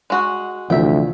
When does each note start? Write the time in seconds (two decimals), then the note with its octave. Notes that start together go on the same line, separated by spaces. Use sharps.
0.10 G#3 F#4
0.70 D2 C3 E3 F3 E5 G5